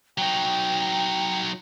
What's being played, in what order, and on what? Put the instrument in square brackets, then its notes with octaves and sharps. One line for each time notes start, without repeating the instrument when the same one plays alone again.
[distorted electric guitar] F#3 D#4 [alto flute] G5